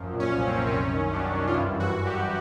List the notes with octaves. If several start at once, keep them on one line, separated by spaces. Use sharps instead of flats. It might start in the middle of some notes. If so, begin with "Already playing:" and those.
Already playing: F#2 F3
A#2
C#4
C2
C4
C2
C4
F#2 C#4
D#3
D#3 D4
F#2
F4
G2 E4
E3
F#4
E3
G4
G2